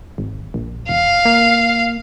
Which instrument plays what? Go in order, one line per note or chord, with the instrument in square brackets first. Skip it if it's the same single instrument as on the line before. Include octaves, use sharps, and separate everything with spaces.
[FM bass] G#1
A#1
[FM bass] E1 [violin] F5
[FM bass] A#3